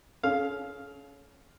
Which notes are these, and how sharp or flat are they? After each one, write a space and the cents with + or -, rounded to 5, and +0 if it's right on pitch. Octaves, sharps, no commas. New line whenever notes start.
C#4 +15 G#4 +45 F5 +0